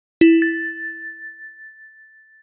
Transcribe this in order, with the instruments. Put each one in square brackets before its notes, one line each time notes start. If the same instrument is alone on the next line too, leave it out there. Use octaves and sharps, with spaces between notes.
[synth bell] E4
A6